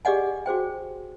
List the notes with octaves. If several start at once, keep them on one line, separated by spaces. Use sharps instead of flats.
G4 G#4 D5 D#5 F#5 G#5
F#4 G#4 C5 G5